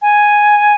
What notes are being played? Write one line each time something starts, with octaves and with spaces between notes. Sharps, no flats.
G#5